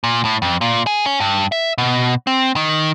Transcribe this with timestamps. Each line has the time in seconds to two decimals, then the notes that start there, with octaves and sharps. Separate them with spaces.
0.04 A#2
0.25 A2
0.42 F2
0.61 A#2
0.87 G#4
1.06 C#4
1.20 G2
1.52 E5
1.78 B2
2.27 C4
2.56 D#3